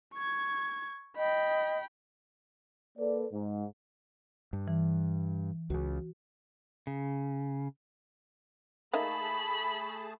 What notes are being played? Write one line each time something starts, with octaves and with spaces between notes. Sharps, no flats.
C#6 G#6
D#5 G5 B5
A#3 A4 B4 D5
G#2
G2
E3
C#2 C#3 F#4
C#3
A3 A#3 D#4 G#4 E5 A5 B5